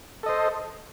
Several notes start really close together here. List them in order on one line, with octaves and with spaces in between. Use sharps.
A4 D#5 C5